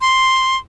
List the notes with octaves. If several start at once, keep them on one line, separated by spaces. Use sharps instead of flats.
C6